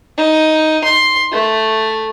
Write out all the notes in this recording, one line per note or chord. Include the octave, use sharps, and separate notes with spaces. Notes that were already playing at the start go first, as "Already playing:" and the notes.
D#4
C6
A3